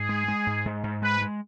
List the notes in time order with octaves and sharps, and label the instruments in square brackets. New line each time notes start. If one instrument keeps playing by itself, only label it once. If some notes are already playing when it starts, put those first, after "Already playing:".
Already playing: [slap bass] G#2 [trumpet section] G#4
[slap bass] G#3
G#3
G#2
G#2
G#2
[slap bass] G#3 [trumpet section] B4
[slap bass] G#3